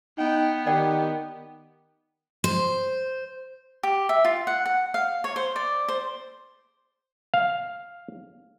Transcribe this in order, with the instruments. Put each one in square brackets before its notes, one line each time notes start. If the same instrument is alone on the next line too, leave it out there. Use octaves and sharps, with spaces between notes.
[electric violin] B3 [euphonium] D#4 [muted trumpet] G5
[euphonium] D#3 [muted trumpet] G4 [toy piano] D5 F#5 G5
[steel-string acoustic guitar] C5
[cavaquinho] G4
E5
F4
F#5
F#5
F5
C#5
C5
D5
C5
[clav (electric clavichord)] F5